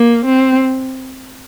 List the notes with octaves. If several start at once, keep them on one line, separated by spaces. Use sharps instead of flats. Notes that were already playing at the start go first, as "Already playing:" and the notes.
Already playing: A#3
C4